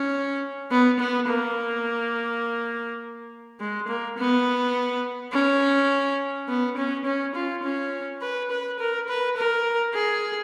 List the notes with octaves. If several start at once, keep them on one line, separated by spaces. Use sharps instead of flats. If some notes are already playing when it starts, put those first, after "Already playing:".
Already playing: C#4
B3
B3
A#3
G#3
A#3
B3
C#4
B3
C#4
C#4
F4
C#4
B4
B4
A#4
B4
A#4
G#4